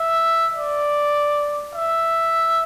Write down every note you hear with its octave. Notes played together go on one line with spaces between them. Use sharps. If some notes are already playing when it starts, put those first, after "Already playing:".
Already playing: E5
D5
E5